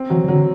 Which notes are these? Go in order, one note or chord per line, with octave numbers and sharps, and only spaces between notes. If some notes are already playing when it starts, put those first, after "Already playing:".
Already playing: C4
E3 F#3
E3
D3 F#3